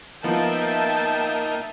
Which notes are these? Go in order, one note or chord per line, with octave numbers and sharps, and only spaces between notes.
F3 A#3 B3 D#4 E5 G5 A5